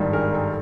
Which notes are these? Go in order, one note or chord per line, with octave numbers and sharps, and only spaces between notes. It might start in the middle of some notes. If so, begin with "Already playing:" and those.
Already playing: G#1 G2 D#3 G3
G#4 A#4
A4